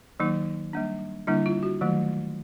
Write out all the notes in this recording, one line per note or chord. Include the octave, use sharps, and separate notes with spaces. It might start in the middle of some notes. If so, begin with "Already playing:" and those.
D#3 F#3 A#3 D#4
G3 A#3 D4
D3 G3 A#3 D4 E4
F4
F#4
D#3 F#3 A3